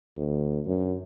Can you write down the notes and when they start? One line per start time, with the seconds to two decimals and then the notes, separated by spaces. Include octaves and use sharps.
0.17 D2
0.67 F#2